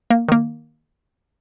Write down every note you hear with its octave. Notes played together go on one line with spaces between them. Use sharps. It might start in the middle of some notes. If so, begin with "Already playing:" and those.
A#3
D#3 A#3